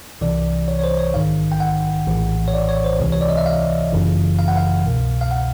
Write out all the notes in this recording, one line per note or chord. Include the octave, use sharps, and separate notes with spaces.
C2 C3 E3 D5
C#5
C#5
C5
C#5
A#1 G#2 D#3 F5
G5
F#5
A#1 A2 E3
C#5
D5
C#5
C5
C#2 C3 E3
C#5
D5
D#5
E5
F5
G1 F#2 C#3 E3
F5
F#5
F5
C2 B2
F5
F#5